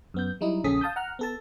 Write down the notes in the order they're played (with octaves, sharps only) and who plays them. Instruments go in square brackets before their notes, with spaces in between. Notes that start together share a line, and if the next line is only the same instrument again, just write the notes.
[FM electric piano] F#2 B3 G6
F#3 G3 D#4 E4
A#1 C#3 C#4 A4 D#6 B6
F5 A5 D#6 G6
F#5 A#5 F6 F#6
B3 A4 A5